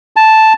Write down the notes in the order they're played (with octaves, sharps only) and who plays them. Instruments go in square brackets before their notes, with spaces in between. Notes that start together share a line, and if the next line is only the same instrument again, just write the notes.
[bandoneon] A5